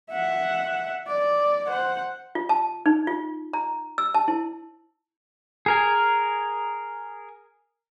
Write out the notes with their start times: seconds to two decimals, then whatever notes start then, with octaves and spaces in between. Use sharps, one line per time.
0.11 E5 F#5
1.07 D5
1.67 C5 F#5
2.35 F4
2.49 A5
2.86 D#4
3.07 F4
3.53 A#5
3.98 E6
4.15 A5
4.28 E4
5.66 G#4 A#4 G#5